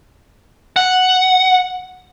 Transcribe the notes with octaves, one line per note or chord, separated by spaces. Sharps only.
F#5